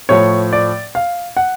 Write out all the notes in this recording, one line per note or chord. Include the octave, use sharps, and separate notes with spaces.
A2 F3 C#5
D5
F5
F#5